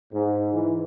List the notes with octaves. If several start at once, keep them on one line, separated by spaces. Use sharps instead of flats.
G#2
E3